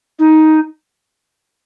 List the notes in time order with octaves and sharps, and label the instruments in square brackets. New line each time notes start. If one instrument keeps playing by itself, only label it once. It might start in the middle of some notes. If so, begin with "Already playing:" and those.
[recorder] D#4